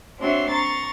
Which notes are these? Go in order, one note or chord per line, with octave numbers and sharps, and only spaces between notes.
C4 D4 F#4 C#5 E5 C6
A#5 C6 C#6 A6